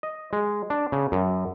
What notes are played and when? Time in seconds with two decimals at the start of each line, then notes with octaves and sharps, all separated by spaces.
0.03 D#5
0.33 G#3
0.70 D4
0.92 C#3
1.12 F#2